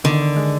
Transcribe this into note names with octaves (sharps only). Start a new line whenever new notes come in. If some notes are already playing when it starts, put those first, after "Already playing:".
D3 D#3
D#3
G#3